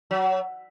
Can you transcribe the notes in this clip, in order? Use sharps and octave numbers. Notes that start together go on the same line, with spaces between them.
F#3